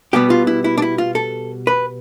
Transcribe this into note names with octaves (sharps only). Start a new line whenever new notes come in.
B2 G3 B3 G4
F4
E4
E4
D4
E4
F4
A4
B4